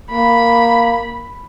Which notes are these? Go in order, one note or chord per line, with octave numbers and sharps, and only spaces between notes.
A#3 B5